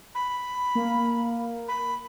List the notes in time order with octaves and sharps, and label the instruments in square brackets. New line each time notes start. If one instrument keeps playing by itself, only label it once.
[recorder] B5
[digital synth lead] A#3
[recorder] B5